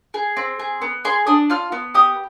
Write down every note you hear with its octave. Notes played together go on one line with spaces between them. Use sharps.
G#4
C4
G#4
B3
G#4 C6
D4 D#6
F4 F6
B3
G4 D#6